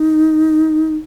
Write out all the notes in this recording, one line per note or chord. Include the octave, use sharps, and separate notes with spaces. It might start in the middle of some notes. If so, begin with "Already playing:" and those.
Already playing: D#4